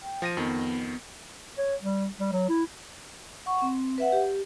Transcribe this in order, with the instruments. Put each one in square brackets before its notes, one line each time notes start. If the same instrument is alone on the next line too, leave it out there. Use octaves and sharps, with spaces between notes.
[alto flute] G5
[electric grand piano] F3 A#6 D#7
[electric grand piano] F2 D#3 [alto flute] B3
[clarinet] C#5
G3
G3
F#3
E4
[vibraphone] F#5 C#6
C4
B4 E5 F#5
G4